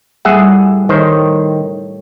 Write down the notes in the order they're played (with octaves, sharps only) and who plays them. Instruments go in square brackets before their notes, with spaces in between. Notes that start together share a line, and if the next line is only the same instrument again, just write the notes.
[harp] A2 G3 E4 [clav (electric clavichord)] G#4 E5 F#5
[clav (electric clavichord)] D#3 C5 [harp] A4 C#5 G5